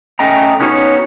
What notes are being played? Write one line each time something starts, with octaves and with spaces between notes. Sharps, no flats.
A3 C#4 D#5 G5 A#5
B3 C#4 D#4 F#4 G4 C#5